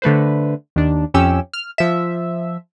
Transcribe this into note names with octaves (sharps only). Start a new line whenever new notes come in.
D3 A3 B4 C5
D#2 D4
F2 C#4 G4 E6
F6
F3 E5